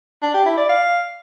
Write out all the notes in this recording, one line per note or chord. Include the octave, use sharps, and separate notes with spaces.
D4
G4
E4
D5
F5